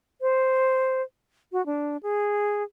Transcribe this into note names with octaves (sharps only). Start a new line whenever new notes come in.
C5
F#4
D4
G#4